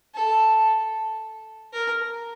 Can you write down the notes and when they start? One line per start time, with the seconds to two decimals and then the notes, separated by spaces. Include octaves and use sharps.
0.14 A4
1.73 A#4